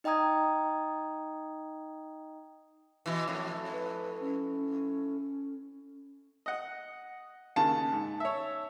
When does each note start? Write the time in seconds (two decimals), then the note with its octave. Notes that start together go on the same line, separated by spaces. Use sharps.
0.04 D#4 D#5 G5 A#5 D#6 G#6
3.06 B2 E3
3.28 F2 A2
3.72 B4
4.20 C#4
6.46 D#5 F#5
7.56 D#2 C#3 A5
7.92 G#2
8.20 C#5 E5